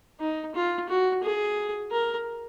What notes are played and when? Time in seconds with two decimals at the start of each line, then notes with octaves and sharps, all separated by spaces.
0.20 D#4
0.55 F4
0.88 F#4
1.23 G#4
1.91 A#4